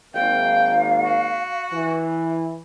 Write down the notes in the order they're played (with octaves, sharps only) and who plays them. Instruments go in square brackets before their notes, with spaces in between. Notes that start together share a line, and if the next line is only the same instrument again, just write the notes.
[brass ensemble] G#1 A#3 [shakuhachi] F5 [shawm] G5
[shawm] F#4
[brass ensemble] E3